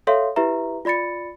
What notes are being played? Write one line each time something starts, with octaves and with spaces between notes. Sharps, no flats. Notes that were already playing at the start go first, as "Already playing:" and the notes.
A4 C#5 E5 F5 C6
E4 G4 B4 E5 A#5
F4 D5 B5 A6 C#7